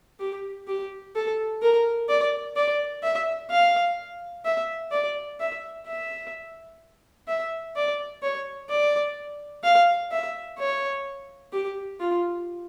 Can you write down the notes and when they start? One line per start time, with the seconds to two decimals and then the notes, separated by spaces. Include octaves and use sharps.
0.20 G4
0.68 G4
1.15 A4
1.62 A#4
2.09 D5
2.56 D5
3.03 E5
3.50 F5
4.45 E5
4.91 D5
5.40 E5
5.87 E5
7.28 E5
7.76 D5
8.22 C#5
8.69 D5
9.64 F5
10.11 E5
10.59 C#5
11.53 G4
12.00 F4